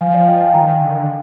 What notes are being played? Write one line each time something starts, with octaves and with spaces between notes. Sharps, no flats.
F3 F5 G#5
D5 F5
D#5 G5
F5 G#5
D#3 G5 A#5
D3
D#3
D3